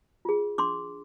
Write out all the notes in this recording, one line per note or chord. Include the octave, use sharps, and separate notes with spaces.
F4 G#4
D4 C6 D6